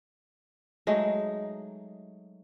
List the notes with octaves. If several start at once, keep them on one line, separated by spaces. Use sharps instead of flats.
F#3 G#3 A3 D#4